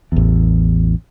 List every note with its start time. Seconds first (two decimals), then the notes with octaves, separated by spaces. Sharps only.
0.12 A1 E2